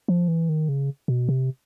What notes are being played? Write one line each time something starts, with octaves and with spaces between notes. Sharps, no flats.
F3
E3
D#3
C#3
B2
C3